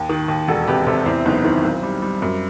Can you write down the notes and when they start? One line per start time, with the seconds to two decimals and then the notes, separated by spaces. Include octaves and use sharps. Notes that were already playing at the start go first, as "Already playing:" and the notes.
Already playing: D#2
0.09 D#3
0.28 D#2
0.48 E1 F#4 A4
0.68 C3 G4 B4
0.87 C3 A4 C5
1.06 E2 C4 E4
1.25 F#1 B3 D#4
1.44 D#3 C4 E4
1.64 B1
1.83 G3
2.02 G3
2.22 F#2